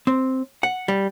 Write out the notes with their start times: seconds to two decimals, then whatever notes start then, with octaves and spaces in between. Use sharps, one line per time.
0.07 C4
0.63 F#5
0.88 G3